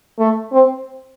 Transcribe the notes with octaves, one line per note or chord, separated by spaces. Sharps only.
A3
C4